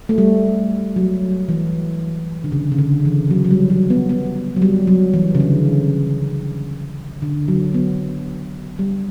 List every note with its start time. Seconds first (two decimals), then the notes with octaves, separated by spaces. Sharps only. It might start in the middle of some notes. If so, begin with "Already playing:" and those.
0.09 A3
0.18 G3
0.96 F#3
1.48 E3
2.44 D3
2.52 C#3
2.72 C#3
2.78 D3
3.05 E3
3.31 F#3
3.45 F#3
3.51 G3
3.70 F#3
3.90 B3
4.09 B3
4.56 F#3
4.62 G3
4.87 F#3
5.14 E3
5.35 C#3
5.40 D3
7.22 D3
7.48 F#3
7.74 B3
8.79 G3